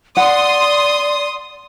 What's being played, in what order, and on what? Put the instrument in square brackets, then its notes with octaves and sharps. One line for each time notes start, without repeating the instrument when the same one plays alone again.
[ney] D5 [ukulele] F#5 [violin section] C6 D#6